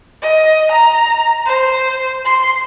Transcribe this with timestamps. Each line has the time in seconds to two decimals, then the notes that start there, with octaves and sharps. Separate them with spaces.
0.22 D#5
0.71 A#5
1.46 C5
2.25 C6